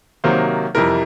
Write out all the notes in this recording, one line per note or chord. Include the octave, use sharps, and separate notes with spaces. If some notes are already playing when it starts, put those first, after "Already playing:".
C3 D#3 F#3 A#3 C5
F2 C3 E3 G3 A#4